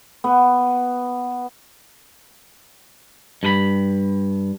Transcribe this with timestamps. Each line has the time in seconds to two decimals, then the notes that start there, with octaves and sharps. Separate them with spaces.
0.24 B3
3.43 G2 B4 B5